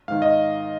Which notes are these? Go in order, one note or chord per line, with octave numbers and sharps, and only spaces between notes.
G#2 D#3 F5
D#5